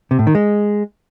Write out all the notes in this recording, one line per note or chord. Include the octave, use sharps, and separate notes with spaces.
C3
A2
D#3
G#3